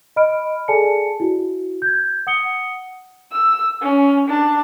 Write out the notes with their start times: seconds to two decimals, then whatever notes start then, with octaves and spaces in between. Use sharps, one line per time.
0.16 D#5 B5 F6 D7
0.68 G#4 A4 D5 G#5 A5 C#7
1.20 E4 F#4
1.82 G6 G#6
2.27 F#5 D#6 C#7 G7
3.32 E6
3.82 C#4
4.28 D4 A5